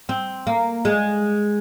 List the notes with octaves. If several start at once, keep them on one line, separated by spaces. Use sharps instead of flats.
C4
A#3
G#3